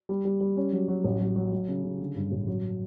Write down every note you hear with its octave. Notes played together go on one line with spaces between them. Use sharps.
G3
G3
G3
C#4
F#3
F#3
A1
F#3
F#3
F#3
C#3
C#3
D3
G2
A1
F#3